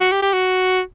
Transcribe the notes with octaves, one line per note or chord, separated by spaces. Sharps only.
F#4
G4
G4
F#4